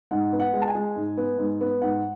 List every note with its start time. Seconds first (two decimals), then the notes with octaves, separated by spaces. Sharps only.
0.11 G#2 F#5
0.33 B3
0.40 F#5
0.54 G#3
0.62 A5
0.68 G#5
0.75 G#3
0.96 G#2
1.17 B3
1.38 G#2
1.61 B3
1.82 G#2 F#5